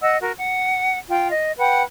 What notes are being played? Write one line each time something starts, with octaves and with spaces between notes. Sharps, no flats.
D#5 F#5 E6
F#4 A#4
F#5
F4 G5
D#5
B4 F#5 G5